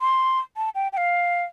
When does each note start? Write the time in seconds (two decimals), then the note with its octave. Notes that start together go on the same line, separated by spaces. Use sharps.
0.01 C6
0.57 A5
0.75 G5
0.93 G5
0.97 F5